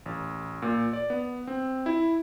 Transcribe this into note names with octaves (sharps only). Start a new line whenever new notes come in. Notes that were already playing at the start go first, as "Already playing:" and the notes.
A1
A#2
D5
B3
C4
E4